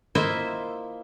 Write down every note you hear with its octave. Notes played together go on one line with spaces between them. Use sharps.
A#3 E4 F4 C5 D#5 E5